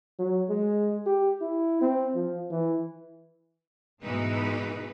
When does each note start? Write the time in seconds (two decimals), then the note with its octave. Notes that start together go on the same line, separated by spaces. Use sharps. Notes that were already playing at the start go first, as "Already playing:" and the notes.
0.19 F#3
0.49 G#3
1.06 G4
1.41 E4
1.81 C4
2.15 F3
2.51 E3
4.03 G#2 B2 E3 G#3 D#4 B4